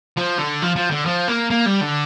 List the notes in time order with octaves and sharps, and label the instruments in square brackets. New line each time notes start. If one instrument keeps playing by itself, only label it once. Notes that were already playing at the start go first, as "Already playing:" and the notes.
[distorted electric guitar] F3
D3
F3
F3
D3
F3
A#3
A#3
G3
D3